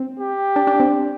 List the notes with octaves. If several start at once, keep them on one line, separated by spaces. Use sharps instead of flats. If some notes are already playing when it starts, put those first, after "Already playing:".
Already playing: C4
G4
D4
D4
C4